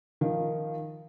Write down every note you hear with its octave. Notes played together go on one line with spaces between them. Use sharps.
D#3 F3